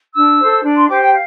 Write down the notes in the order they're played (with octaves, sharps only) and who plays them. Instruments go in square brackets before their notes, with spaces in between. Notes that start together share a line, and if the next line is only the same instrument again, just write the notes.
[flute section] D4 E6
A4 C5
D4
C6
G4 C5 D6
G5
F5